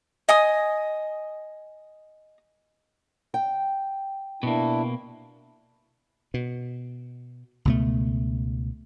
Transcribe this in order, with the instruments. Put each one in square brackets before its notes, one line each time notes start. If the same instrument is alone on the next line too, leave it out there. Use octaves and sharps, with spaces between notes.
[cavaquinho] D#5 G#5 D#6
[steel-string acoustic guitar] G5
[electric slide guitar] B2 A#3 [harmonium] D4 E4
[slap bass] B2
C#2 B2 A3